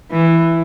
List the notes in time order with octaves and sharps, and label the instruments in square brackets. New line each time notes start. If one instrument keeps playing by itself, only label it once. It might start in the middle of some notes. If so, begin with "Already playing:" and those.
[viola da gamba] E3